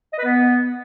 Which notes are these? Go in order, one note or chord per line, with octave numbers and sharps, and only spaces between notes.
D#5
B4
B3